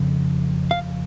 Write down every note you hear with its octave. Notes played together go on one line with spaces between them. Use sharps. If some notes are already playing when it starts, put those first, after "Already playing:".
Already playing: F2 C#3
F5